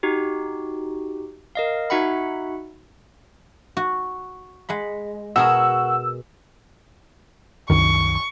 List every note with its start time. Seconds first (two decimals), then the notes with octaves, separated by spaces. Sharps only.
0.03 D#4 F#4 G4
1.55 A#4 D#5 F5
1.90 D#4 F#4 E5 F#5 B5
3.77 F#4
4.69 G#3 F#5 B5
5.36 B2 F#4 G#4 A#4 E6
7.70 C2 F#2 D#3 C#6